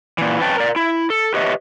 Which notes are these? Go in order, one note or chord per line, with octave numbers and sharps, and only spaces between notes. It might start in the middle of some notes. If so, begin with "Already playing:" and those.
A#2 E3
F2 C#4 B4 G5 A5
A#4 D5
E4
A4
G4 B4 C#5 D#5 E5